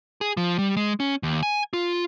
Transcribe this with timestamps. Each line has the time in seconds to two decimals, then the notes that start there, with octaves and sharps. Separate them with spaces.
0.21 G#4
0.37 F3
0.59 G3
0.77 G#3
1.00 C#4
1.23 D#2
1.43 G#5
1.73 F4